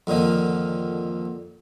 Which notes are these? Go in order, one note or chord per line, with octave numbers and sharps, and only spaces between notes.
F2 A#2 D3 D#3